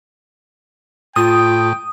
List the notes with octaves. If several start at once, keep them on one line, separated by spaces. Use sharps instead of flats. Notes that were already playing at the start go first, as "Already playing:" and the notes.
A2 F4 G5 D#6